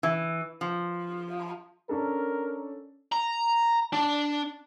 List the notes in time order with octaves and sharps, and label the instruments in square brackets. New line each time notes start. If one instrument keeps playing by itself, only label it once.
[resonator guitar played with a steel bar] E3
F3
[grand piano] C#4 D4 A4 [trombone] A#4
[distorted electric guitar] A#5
D4